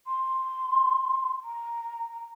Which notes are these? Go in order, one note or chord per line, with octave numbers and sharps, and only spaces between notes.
C6
A#5
A#5